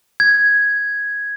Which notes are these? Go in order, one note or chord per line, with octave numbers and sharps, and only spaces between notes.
G#6